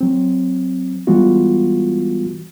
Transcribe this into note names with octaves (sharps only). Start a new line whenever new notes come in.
F#3 C4
E3 G3 G#3 B3 F4 F#4